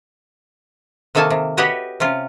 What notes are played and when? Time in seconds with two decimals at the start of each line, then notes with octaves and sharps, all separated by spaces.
1.15 C3 D#3 A#3 A4 G#5 A5
1.30 C3
1.57 F#4 G4 B4 C#5 D#5 E5
2.00 C3 C#4 F4